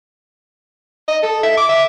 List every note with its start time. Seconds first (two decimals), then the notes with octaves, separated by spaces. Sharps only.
1.08 D#5
1.23 A4
1.43 E5
1.57 D6
1.69 E5